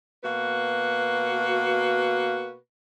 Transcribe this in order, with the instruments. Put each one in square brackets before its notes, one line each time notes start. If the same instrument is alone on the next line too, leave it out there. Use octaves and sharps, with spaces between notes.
[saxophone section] B2 A#3 F#4 B4